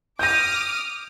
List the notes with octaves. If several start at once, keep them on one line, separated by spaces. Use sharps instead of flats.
D6 D#6 F6 G6 A#6